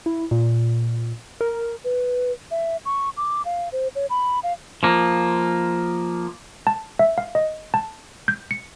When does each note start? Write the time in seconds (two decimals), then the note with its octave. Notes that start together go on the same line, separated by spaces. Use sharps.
0.06 E4
0.31 A#2
1.41 A#4
1.84 B4
2.51 E5
2.85 C#6
3.17 D6
3.45 F5
3.72 C5
3.95 C#5
4.10 B5
4.43 F5
4.83 F3 A#3
6.67 A5
6.99 E5
7.18 F5
7.35 D#5
7.74 A5
8.28 G6
8.51 C#7